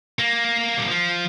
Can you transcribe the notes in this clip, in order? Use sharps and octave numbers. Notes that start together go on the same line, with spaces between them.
A#3
G3
F3